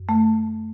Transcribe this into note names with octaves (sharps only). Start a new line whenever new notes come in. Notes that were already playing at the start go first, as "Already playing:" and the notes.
Already playing: F#2
A3